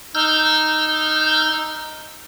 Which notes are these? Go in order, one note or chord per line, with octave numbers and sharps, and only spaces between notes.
D#4 E6 F6 G6